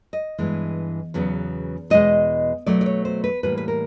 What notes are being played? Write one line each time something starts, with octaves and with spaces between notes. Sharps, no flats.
D#5
G2 E3 G#3 B3
E2 C#3 F#3 B3
E2 B2 G#3 D#5
B2 F#3 A3 D5
D5
C#5
C5
B4
A2 E3 G3 A#3 B4
B4
A#4